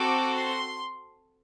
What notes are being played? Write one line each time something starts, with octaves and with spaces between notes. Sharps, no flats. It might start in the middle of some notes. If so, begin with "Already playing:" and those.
Already playing: C4 F#4 A4 D6
C6